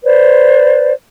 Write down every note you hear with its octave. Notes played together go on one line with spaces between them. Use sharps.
B4 C5 D5